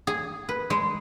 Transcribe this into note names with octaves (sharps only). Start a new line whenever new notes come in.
G#4
B4
G#3